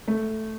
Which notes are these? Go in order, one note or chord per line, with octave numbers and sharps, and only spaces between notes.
A3